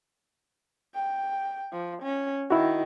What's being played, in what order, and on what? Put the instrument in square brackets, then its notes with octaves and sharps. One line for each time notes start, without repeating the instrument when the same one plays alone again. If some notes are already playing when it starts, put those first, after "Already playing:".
[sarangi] G5
F3
C#4
[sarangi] D#3 [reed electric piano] E4 F#4